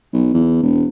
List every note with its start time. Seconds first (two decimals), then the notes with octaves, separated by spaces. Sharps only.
0.13 B1
0.34 E2
0.62 E1